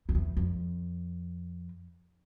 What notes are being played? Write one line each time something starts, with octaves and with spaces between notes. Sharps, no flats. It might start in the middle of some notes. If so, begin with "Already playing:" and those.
F2
E2
F2